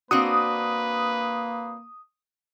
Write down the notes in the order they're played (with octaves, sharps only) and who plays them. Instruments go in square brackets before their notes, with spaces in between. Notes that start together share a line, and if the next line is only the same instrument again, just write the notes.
[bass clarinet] A#3 [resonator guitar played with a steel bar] C4 D4 F#4 [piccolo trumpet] B4 [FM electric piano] D#6